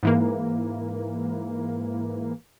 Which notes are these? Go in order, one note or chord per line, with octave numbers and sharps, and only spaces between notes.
G#2 E3 A#3